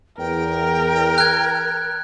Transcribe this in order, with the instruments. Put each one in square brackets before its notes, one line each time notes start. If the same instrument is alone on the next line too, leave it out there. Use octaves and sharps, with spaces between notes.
[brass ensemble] E2 [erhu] A#4 [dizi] G5
[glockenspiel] F#6 G#6